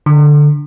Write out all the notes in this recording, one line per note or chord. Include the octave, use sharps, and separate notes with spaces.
D3